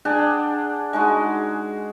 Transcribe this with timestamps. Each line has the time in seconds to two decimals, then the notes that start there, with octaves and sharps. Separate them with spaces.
0.05 D4 G#4 F#5 G5
0.93 G#3 D#4 F#4